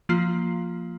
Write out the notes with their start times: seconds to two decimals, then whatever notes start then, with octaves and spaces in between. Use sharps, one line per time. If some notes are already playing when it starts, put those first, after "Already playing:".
0.09 F3 A#3 F4